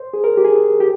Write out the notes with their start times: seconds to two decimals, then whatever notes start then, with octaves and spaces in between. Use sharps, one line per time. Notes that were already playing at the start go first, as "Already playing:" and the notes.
Already playing: C5
0.13 G#4
0.24 A#4
0.37 G4
0.45 G#4
0.80 G4